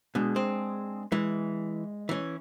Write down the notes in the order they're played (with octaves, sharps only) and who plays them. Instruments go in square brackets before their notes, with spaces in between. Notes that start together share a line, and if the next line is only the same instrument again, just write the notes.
[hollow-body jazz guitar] B2 [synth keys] G#3 D4 G#4
[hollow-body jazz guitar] C4
[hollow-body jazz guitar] E3 [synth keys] G#3
[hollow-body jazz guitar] E3 C#4